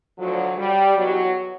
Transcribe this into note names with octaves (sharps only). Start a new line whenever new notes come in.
D2 D3 F3 F#3
G3
E2 B2 F#3